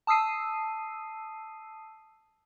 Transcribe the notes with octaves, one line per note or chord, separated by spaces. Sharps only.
A5 D#6 E6 C7 D#7